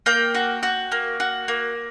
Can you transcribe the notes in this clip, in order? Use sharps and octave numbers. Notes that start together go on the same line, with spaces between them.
A#3 G5
F#4
F#4
A#3
F#4
A#3